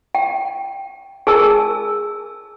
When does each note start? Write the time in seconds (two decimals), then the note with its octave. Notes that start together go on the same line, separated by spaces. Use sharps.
0.15 G5
1.27 G#4 A#4 G#5 A5 E6